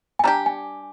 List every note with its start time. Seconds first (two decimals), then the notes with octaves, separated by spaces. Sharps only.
0.19 G#5
0.24 G3 D4 G4 A#5
0.46 G#5